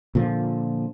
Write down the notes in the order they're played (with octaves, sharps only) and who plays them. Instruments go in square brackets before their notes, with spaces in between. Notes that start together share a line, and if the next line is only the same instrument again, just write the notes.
[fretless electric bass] A#2 D3 F3